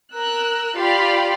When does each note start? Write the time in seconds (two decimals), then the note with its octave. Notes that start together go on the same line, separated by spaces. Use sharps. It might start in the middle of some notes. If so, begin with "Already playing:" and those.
0.15 A#4 E6 F#6
0.76 F4 G4 D5 B5 C6 F6